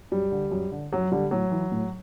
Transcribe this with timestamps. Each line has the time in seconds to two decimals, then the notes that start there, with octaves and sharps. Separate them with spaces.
0.12 F#2 G3
0.32 D3
0.52 F#2
0.72 D3
0.93 F#2 F#3
1.12 D3 G3
1.31 A2 F#3
1.51 E3
1.72 A2